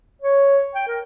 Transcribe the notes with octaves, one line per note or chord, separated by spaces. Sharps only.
C#5
G5
A#4